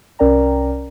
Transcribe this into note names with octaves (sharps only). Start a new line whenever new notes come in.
C2 C#4 A#4 D5 G5 A#5